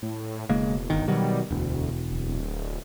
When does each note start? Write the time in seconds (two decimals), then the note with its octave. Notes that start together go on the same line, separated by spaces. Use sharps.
0.02 A2
0.49 E1 C#3 G#3 A#3
0.90 G1 D#3
1.08 B2 D#3 F#3 G3
1.51 E1 D2
2.11 D1